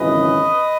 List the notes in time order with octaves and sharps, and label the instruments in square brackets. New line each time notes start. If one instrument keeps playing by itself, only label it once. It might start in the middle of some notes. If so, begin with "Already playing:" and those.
Already playing: [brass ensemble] G#1 F#2 C#3 E3 B4 D#5